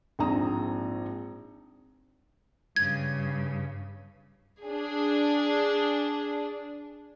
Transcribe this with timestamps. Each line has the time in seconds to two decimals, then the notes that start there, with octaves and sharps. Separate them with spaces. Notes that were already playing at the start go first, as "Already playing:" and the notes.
0.19 A#1 G#2 C4 A#5 D#6
2.76 G2 C#3 G#6
4.65 D4 G#4